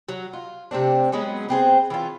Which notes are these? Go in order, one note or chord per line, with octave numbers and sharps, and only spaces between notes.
F#3
F4
C3 A3 C4 D4
F#3 G#3 B3 C#4
B3 C4 G#4 C5
E3 C#4 F4